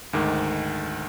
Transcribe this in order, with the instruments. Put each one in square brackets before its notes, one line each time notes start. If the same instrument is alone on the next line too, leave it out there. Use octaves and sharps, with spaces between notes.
[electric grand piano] D2 G#2 D#3